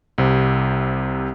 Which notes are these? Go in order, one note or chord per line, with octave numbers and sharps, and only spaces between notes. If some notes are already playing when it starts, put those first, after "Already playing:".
C2 C3